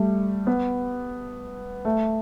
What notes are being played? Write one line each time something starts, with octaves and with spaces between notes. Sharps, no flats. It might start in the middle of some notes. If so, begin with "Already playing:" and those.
Already playing: G3 A3
B3
A3